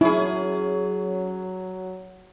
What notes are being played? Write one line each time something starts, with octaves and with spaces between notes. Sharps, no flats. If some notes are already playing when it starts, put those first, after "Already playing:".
F#3 C#4 E4 G#4